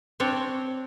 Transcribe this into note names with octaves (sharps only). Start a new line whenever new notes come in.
C4 D4 C#5